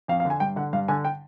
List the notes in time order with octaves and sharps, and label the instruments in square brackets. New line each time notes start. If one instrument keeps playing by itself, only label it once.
[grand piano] F2 F5
F5
D3
G#5
G2 G5
D3 F#5
G2 F5
D3 G#5
G5